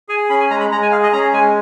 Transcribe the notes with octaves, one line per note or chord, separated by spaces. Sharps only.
G#4 G#5
C#4 B5
G#5
G#3 A#5
B5
G#3 A#5
G#5
G#4 F5
D#5
C#4 A#5
G#3 G#5